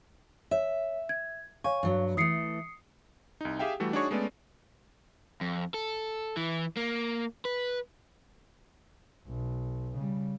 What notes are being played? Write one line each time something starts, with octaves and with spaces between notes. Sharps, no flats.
C#5 E5
G#6
C#5 F5 G#5 C#6
G2 F#3
E3 A3 D#6 C7 C#7
C2 D#4
G4 G#4 E5 F5 G5
E3 G3 A3 F#4
D4 D#4 F#4 G#4 C#5 C#6
G#3 A3 B3 C#4 D5
F2
A4
E3
A#3
B4
B1
C#3 G3